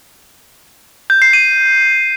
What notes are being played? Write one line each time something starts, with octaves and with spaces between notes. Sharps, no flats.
G6
C7
D#7